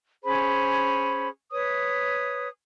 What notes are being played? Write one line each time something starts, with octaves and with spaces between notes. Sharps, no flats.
C#4 G#4 C5 B5
B4 C#5 D#6